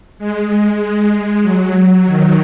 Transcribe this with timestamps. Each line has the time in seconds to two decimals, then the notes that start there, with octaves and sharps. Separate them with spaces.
0.18 G#3
0.80 G#3
1.43 F#3
2.05 D#3